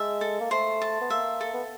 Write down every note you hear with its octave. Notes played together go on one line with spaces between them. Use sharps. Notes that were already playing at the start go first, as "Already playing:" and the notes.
Already playing: G#3 E5 A5
A4
A#3
A3 C5
A5
B3
A#3 E5
A4
B3